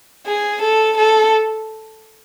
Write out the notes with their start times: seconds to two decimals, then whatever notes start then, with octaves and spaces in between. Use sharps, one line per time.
0.27 G#4
0.62 A4
0.97 A4